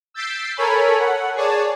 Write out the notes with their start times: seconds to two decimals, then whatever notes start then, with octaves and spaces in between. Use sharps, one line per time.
0.14 E6 G6 A6 B6 C7 D7
0.57 A4 A#4 C#5 G#5 B5
0.99 F#5
1.35 G#4 C#5 D5 A5